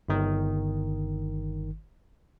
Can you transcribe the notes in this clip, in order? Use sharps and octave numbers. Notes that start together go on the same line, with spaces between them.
G1 D#3